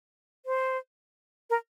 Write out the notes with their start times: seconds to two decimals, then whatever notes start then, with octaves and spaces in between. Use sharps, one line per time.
0.46 C5
1.50 A#4